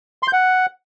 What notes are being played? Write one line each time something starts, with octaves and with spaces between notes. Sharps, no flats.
C6
G6
F#5